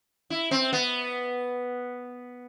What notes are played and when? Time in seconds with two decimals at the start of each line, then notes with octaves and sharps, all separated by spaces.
0.30 E4
0.51 C4
0.73 B3